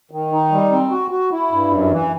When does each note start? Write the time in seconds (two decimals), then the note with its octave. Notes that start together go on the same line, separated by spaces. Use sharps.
0.11 D#3
0.32 D#4
0.52 G3
0.71 C4
0.91 F#4
1.11 F#4
1.32 E4
1.51 G2
1.71 F#2
1.91 E3